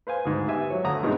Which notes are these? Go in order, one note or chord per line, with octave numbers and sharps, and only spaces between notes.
B4 C5 F5 G#5
D2 G#2
B3 G4 E5 G#5
F#3 C#5
D2 A3 F#5 A#5 D#6
G2 B2 G#3 C4 D#4